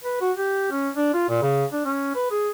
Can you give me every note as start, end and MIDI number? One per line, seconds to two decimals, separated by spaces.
0.04 0.20 71
0.21 0.32 66
0.37 0.67 67
0.71 0.90 61
0.96 1.11 62
1.14 1.29 65
1.29 1.40 46
1.42 1.65 49
1.72 1.83 62
1.85 2.11 61
2.15 2.26 71
2.31 2.50 68